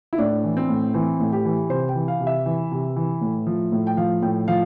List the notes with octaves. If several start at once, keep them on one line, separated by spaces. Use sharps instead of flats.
E4
A2 D4
E3
C4
A2
E3 C4
A2
G4
E3
C3 C5
G5
E3
F5
C3
E5
E3
C3
E3
A2
F3
A2
G5
F3 F5
A2 G5
F3 F5